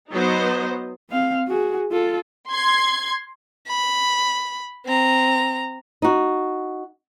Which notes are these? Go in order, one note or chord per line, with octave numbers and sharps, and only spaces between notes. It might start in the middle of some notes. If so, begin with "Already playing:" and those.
F#3 B3 D#4 C5 D#5
C4 F5
F#4 G#4
F4 A4
C6 G#6
B5
C4 A#5
D#4 F#4